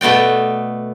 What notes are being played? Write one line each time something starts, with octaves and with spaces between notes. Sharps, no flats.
B2 A3 B3 D5 G5